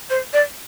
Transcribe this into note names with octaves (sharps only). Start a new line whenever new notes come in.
C5
D5